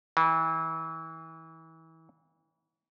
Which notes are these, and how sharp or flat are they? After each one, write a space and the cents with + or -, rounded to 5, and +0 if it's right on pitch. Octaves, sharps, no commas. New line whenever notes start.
E3 -30